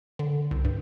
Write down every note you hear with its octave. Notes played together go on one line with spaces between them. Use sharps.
D3
C2
G2